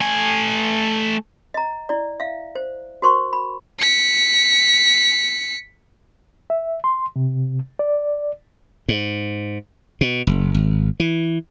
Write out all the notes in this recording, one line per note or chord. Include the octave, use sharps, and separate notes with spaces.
A3 G#5
D#5 A#5
E4 D5
E5 F5
C5
F#4 A#4 C5 C6 C#6
B5
B6 C#7
E5
C6
C3
D5
G#2
B2
F#1
G#1
E3